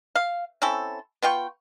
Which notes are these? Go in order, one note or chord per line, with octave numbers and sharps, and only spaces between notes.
F5
C4 C#4 E4 A4
B3 F4 G5 C#6